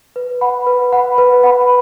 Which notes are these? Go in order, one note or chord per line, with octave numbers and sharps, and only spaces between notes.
B4
F#5 B5
B4
F#5 B5
B4
F#5 B5